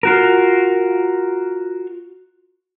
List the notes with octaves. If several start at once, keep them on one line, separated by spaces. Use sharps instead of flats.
F4 F#4 A#4